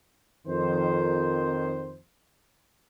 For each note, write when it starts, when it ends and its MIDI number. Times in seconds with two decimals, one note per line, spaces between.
0.47 1.98 41
0.47 1.98 51
0.47 1.98 72